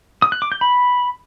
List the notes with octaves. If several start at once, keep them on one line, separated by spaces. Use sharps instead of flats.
D#6
F#6
D6
G6
B5